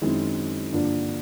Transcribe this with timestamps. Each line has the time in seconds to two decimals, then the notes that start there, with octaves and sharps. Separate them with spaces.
0.01 F#2 D#3 G#3 C4 E4
0.72 G2 D3 F3 A#3 D4